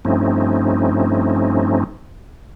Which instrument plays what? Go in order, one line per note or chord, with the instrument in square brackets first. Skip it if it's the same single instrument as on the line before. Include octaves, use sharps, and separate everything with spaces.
[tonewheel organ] G2 F3 A3 C4 C#4 D#4